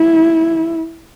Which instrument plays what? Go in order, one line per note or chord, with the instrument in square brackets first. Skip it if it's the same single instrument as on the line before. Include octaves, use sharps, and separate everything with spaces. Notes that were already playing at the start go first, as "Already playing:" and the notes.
Already playing: [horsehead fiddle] E4